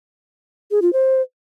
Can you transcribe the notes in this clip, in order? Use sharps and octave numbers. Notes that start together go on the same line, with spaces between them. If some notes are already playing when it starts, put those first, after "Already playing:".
G#4
F4
C5